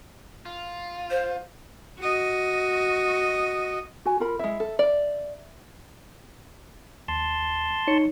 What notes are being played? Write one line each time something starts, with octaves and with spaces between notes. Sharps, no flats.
F4
C5
F#4 D#5
F#4 G#5
F4 A#4 B5
G#3 E4 E5
A4
D5
D#2 A5 C6
D#4 C#5 C#7